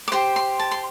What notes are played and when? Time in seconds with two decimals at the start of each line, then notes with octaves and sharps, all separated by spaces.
0.08 D6
0.12 G4 C5 C6
0.36 C6
0.59 A5
0.71 C6